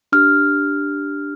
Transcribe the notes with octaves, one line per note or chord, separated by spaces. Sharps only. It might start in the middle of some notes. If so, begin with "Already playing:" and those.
D4 G4 F6